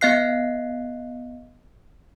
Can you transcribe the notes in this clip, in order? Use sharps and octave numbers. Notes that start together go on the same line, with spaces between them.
B3 D#5 F5 F#6 C7